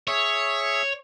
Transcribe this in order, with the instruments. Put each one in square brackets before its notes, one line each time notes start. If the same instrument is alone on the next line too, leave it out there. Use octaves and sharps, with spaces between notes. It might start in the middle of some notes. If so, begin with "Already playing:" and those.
[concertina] G#4 E5 [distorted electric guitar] C#5